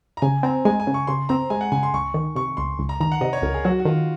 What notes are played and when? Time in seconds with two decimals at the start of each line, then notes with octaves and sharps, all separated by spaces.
0.17 A#5
0.22 C#3 G#5
0.43 C4 A#5
0.65 G#3 G#5
0.80 G#5
0.87 C#3
0.94 C#6
1.07 C#3 C6
1.29 C4 A#5
1.50 G#3 G#5
1.61 F#5
1.72 C#3 G#5
1.83 C6
1.94 C#2 C#6
2.14 D#3
2.36 C3 C#6
2.57 C#2 C6
2.79 C#2
2.89 A#5
3.00 D#3 A#5
3.12 F#5
3.21 C3 D#5
3.33 C#5
3.42 C#2 A#4
3.54 G#4
3.64 F#3 F#4
3.80 F#4
3.85 D#3 F4